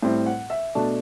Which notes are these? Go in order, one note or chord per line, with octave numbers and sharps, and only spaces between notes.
A2 G3 C4 E4
F#5
E5
B2 A3 D4 A5